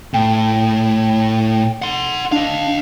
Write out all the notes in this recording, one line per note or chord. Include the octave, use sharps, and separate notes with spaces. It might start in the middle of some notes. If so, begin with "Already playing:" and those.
A2 G5
F#5 C6
D4 D#5 F5